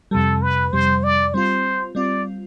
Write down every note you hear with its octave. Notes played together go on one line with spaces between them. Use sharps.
F2 C3 G3 A4
B4
F2 C3 G3 C5
D5
G3 C4 F4 C5
G3 C4 F4 D5